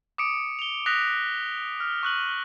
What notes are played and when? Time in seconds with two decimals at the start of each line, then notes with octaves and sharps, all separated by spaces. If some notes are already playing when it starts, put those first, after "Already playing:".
0.18 D6 D#6 C#7 D7
0.59 F7 G7
0.86 D#6 F#6 A#6 B6 F7
1.80 F6
2.03 C#6 F#6 F#7